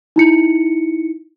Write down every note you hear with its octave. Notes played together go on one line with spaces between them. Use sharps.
D#4 E4 C#7